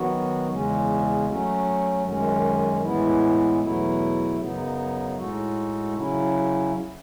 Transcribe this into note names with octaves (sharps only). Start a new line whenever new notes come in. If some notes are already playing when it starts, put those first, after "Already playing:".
Already playing: D#3 F#3 B3 F#4
E2 C#3 G#3 C#4
F#3 A3 C#4
F#2 D#3 G#3 C#4
A2 E3 G#3 B3 E4
E2 B2 F#3 A3 E4
F#2 C#3 F#3 B3 D#4
A2 G#3 D#4 F#4 A4
C#3 F#3 C#4 E4